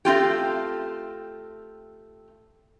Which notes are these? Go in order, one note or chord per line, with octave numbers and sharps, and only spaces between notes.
A3 C4 F4 G4